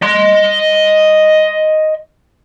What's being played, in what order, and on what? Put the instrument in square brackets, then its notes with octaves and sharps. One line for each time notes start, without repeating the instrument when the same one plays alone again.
[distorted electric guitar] D#5 C6